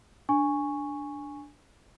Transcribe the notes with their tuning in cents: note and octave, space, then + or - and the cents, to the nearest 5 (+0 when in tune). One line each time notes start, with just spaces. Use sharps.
D4 +0 G#5 -5 C#6 +0